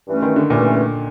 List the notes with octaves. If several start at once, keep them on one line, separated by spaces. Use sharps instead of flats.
G2 E3 A3 C#4
D#3
D3
G2 A#2 E3 A3 C#4